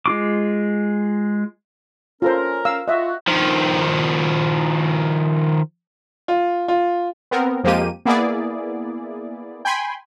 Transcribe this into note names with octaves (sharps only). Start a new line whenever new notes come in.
G#3 F4 D6
C#4 F4 A4 A#4 C5
F5 E6
F4 F#4 D#5 E5
D#3 F3
F4
F4
B3 C4 A#4
F2 F3 G#3 A#3 G4 D#7
A#3 B3 E4 G#4 D5
G5 G#5 B5 C6